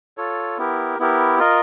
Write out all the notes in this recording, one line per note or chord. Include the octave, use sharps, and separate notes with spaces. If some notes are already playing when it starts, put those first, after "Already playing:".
F4 A4 C#5
B3 E4 G4 A#4
B3 E4 G4 A#4
F4 A#4 D#5